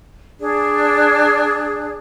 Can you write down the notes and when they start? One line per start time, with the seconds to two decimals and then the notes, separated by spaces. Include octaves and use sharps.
0.39 D4 G#4 D5